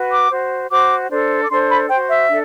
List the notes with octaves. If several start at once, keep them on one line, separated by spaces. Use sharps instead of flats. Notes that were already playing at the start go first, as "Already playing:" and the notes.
Already playing: F#4 B4
D6
F#4 C5
F#4 C5 D6
D4 A4 C5
D6
D4 A4 C5 C6
B5
F#4 C5 G5
E5
D4 A4